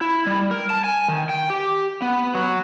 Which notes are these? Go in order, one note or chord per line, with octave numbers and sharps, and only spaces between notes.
E4
G3
A#4
A5
G#5
D#3
G5
G4
B3
F#3